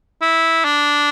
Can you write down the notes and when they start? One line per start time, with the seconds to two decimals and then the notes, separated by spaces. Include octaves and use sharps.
0.22 E4
0.64 D4